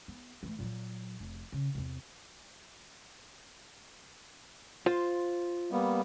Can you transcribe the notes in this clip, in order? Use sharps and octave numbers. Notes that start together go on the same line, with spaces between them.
B3
E3 A3
A#2 F#3
F1
C#3
E2 C3
F4 C5
G3 A#3 B3